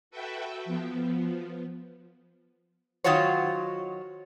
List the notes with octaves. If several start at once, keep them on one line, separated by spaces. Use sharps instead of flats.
F#4 A4 B4 E5 G5
F3 B3
D#3 F#3 F4 F#4 C5 C#5